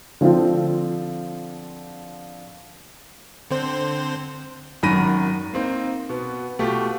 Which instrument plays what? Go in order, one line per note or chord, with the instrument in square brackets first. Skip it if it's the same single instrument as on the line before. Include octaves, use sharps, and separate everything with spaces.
[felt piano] D3 F3 C4 F4
[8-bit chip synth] D3 C4 C5
[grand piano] G#1 F#2 D#3 B5 A#6 D#7
A#3 C4 D#4
B2 B3
B2 A3 F4 G4